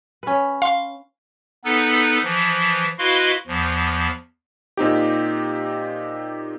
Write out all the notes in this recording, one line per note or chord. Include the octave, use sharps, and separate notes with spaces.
C#4 B4
F5 C6
B3 D#4 A4 B4
E3 F3
E4 F#4 B4 D#5 F5 C6
E2 F3
A#2 C4 D#4 G4